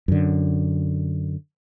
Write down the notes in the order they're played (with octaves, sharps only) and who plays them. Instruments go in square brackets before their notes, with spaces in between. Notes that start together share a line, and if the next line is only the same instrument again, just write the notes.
[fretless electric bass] F#2 D3